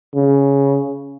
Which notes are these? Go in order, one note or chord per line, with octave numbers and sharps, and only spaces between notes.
C#3